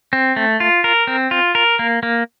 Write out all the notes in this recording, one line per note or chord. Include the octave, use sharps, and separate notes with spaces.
C4
A3
F4
A#4
C4
F4
A#4
A#3
A#3